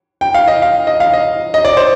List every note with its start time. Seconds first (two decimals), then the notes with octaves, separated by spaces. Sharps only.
0.21 G5
0.34 F5
0.48 D#5
0.62 F5
0.87 D#5
1.00 F5
1.13 D#5
1.54 D#5
1.65 D5
1.77 C5